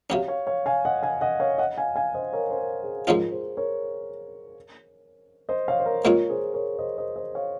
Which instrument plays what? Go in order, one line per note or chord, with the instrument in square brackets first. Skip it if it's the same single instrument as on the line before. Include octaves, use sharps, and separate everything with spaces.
[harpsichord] C3 F#3 C#4 [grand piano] C#5 F5
[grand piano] C#5 F5
C#5 F5
F5 G#5
D#5 F#5
F5 G#5
D#5 F#5
C#5 F5
D#5 F#5
F5 G#5
F5 G#5
C5 D#5
A#4 C#5
C5
A#4
G#4
[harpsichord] G#2 F3 G#3 C#4 F4 [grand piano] A#4
[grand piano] G#4 C5
A#4 C#5
C5 D#5
C#5 F5
C5
A#4
[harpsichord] A#2 G#3 C4 F4 [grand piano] A#4 C#5
[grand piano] G#4 C5
A#4 C#5
C5 D#5
C5 D#5
C5 D#5
C#5 F5